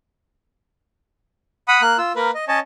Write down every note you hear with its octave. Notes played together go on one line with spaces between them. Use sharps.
F#5 B5 D#6
A#3 F#6
F4 E6
A#3 A#4 B4
D#5
C#4 C#5 D#5 A5